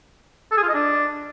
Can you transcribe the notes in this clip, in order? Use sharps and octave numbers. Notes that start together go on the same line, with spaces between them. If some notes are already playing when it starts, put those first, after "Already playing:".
A4
G#4
F4
D#5
D4